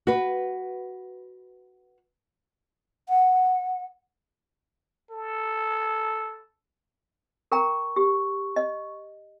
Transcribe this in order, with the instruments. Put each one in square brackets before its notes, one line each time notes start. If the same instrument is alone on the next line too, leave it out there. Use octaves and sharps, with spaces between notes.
[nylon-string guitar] F#4 B4
[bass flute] F#5
[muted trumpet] A4
[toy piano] A#4 G5 A#5 [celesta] C#6
[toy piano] G4 [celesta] C#6
[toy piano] D#5